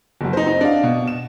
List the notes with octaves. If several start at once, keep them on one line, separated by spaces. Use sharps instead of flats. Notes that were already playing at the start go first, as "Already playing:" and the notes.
F#1 F#3
D#4 C5
D#4
D4 F5
B2
E7